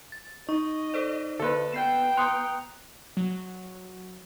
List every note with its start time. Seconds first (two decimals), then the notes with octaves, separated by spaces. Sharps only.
0.12 A6
0.49 D#4 D#5 C#6
0.94 A4 C5 D5
1.39 D3 A#3 A4 B4
1.72 B3 G5 G6 C7 E7
2.17 A#5 C6 D#6 F#6 C#7 F7
3.17 F#3